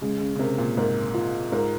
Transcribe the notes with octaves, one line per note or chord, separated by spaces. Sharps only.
C#3 G#3
C#3
C#3
C3 A#4
A#2
G#2 A#4
F4
G#2 A#4